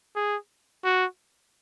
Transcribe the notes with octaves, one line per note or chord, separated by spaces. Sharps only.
G#4
F#4